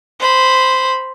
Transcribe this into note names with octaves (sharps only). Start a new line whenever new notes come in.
C5 B5